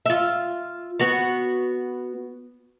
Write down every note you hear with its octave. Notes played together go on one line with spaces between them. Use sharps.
F4 E5
B3 F#4 C#5